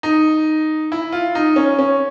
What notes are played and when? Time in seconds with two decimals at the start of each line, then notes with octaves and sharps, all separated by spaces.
0.03 D#4
0.92 E4
1.12 F4
1.35 D#4
1.56 C#4
1.79 C#4